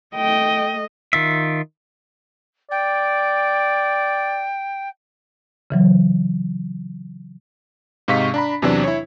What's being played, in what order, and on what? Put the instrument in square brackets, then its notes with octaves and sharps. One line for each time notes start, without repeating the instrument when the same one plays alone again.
[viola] A3 D#5 [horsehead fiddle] G5
[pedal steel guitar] D#3 F4 E5
[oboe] D5 [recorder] G5
[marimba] C#3 E3 F#3
[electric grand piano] G#2 C3 D#5 F5 C#6 B6
D4 A#5 B5
E2 C3 E3 F#3 C4 D4
E4 C#5